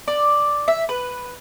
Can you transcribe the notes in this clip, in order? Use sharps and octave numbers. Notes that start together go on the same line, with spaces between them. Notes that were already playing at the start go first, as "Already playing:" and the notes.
D5
E5
B4